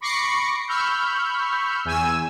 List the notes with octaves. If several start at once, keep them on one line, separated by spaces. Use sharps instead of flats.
B5 C#6 D6 A#6 C7 C#7
B5 C#6 E6 F6 G6
E2 G#5 E6